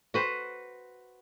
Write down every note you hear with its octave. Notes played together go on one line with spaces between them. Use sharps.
F#4 B4 C5